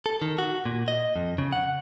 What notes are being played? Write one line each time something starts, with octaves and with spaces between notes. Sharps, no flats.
A4
D#3
F#4
A#2
D#5
F2
C#3
F#5